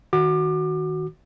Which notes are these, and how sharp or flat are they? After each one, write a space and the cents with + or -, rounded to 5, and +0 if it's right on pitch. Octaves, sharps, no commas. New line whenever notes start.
D#3 +10 F#4 +0 D6 +30